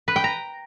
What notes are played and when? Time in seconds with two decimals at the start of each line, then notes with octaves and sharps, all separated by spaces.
0.08 B4
0.16 G5
0.24 A#5